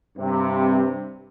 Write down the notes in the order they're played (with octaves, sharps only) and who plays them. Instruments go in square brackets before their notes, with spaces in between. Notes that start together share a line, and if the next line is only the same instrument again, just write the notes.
[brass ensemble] G2 C3